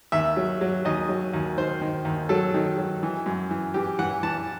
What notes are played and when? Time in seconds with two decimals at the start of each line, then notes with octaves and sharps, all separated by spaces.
0.12 D#2 E5
0.37 F#3
0.61 F#3
0.85 D#2 D#5
1.09 F#3
1.34 D#2
1.58 D#3 C5
1.81 D#3
2.05 D#2
2.29 F#3 A4
2.54 D#3
2.78 F#3
3.03 E3
3.26 F#2
3.51 E3
3.74 E3 G4
3.99 E3 F#5
4.23 E3 A5